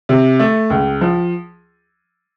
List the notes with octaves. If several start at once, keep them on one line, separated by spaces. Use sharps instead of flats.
C3
A3
C#2
F3